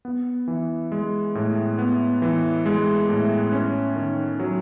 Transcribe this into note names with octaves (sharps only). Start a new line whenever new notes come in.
B3
E3
G#3
A2
B3
E3
G#3
A2
C#4
D#3
F#3